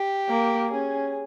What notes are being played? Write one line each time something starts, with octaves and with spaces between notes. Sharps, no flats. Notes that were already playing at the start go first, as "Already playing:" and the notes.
Already playing: G4
A#3
C#4 G#4